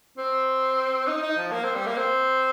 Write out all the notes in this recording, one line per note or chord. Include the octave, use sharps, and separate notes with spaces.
C4
D#4
D#4
F3
A#3
C4
G3
A#3
C4